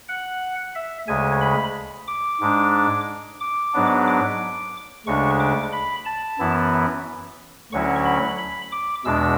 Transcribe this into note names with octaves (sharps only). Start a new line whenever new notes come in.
F#5
E5
D2 C#3 G#3 G#5
B5
D6
G#2 G#3 D4
D6
G#2 F#3 B3 D4
D6
D2 C#3 G#3 D4 C#6
D6
B5
A5
F#2 E3 B3 E4
D2 D3 F#3 C#4 E4 C#6
B5
B5
D6
E2 B2 G#3 D4 E6